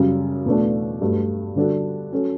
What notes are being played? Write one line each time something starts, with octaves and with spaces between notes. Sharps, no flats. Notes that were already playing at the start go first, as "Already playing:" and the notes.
Already playing: F#2 C#3 G3
E2 B2 A3 D4
G2 F#3 A3
D3 G3 D4 F#4 A4
F#3 C#4 F#4 A4